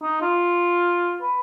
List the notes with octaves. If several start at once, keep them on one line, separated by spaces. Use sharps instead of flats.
D#4
F4
B4